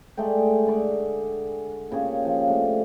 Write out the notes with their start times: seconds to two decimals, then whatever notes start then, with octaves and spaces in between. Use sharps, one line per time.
0.17 G#3 A3 D5 G5
0.66 D3 G#4 D5 C#6
1.91 A#2 C#3 G4 C#5
2.25 F3
2.47 A3 D4